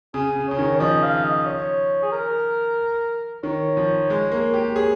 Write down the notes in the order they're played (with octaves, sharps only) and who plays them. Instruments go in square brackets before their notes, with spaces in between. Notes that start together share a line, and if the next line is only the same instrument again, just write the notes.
[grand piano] C#3 [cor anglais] G#4
[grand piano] C#3
[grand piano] C#3 [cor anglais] C#5
[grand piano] D#3
[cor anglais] C#5
[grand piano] F3 [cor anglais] D#5
[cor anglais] F5
D#5
C#5
G#4
A#4
[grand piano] D#3 [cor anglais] C#5
[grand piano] F3
G#3
A#3
G4
[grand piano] G#4 [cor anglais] C#5